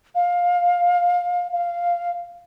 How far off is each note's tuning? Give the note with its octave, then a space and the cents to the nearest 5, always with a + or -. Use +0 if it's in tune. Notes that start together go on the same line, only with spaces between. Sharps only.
F5 +20
F5 -10